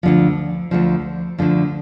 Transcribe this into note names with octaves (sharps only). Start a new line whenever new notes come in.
D2 D3 F3
D2 D3 F3
D2 D3 F3